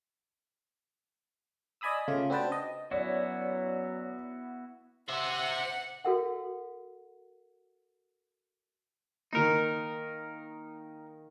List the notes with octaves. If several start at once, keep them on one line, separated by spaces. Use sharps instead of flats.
D5 D#5 G#5 B5 D#6 E6
C#3 A3 F4
C4 D4 F#4 B4 G5 A5
D#5
F#3 B3 C#4 E4 F#4 D5
C5 E5 F#5
F#4 A4 A#4 E5 F#5
D#3 A#3 D#4 A#4